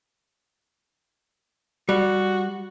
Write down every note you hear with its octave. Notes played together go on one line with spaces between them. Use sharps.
G3 F#4